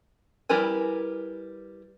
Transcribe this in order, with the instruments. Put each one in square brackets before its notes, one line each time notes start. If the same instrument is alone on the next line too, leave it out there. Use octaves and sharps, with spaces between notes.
[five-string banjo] G3 E4 A#4 B4 G#5